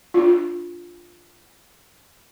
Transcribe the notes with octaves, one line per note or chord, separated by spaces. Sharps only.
D4 F4